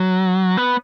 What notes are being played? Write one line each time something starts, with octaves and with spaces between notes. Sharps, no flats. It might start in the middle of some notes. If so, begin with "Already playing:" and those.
Already playing: F#3
B3